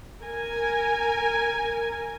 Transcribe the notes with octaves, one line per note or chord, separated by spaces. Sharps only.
A#4 G#5